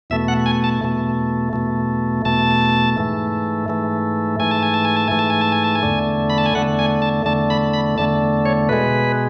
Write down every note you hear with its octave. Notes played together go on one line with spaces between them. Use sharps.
E2 B2 A3 E5
F#5
G#5
A5
E2 B2 A3
E2 B2 A3
E2 B2 A3 A5
G#2 E3 A3
G#2 E3 A3
G#2 E3 A3 G#5
A5
G#5
A5
G#5
A5
G#2 E3 A3 G#5
A5
G#5
A5
G#5
A5
G#5
E2 D3 A3
B5
A5
G#5
E2 D3 A3 F#5
G#5
A5
E2 D3 A3 A5
B5
B5
E2 D3 A3 A5
C#5
B2 G#3 B4